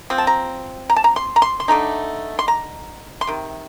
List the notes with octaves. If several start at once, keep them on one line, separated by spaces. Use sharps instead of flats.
F3 C4
A5
A#5
A#5
A5
A#5
C6
A#5
C6
C6
D3 A3 D#4 A#5
C6
A#5
C6
C3 D#3